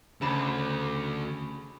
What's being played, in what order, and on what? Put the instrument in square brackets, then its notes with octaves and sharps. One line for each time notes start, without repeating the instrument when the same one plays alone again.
[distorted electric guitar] D2 [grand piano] C#3 B5 E7